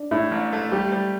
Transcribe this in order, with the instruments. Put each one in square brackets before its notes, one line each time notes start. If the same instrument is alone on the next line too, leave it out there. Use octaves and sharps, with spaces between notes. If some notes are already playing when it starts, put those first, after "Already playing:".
Already playing: [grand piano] D4
[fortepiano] A2 [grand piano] E4
[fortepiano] A1
A3
[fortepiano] G3 [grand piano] G4
[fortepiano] G3